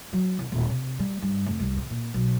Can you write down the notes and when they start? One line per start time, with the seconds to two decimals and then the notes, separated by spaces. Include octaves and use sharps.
0.13 F#3
0.39 C2
0.52 D#1
0.70 C3
0.99 G3
1.22 G2
1.46 F1
1.60 C2
1.77 C3
1.90 A#2
2.14 B1